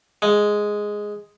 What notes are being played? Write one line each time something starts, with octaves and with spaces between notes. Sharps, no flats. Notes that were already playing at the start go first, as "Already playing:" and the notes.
G#3